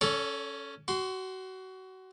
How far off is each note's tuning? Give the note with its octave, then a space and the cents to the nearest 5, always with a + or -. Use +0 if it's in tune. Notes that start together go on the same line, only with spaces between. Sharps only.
C#4 +0 A4 +0 C#5 +45
F#4 +25 C6 +0